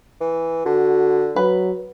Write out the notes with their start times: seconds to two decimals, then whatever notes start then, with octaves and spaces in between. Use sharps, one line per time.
0.21 E3
0.66 D3 F#4
1.36 F#3 B4